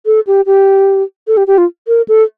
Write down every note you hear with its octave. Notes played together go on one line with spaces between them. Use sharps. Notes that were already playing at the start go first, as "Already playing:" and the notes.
A4
G4
G4
A4
G4
G4
F4
A#4
A4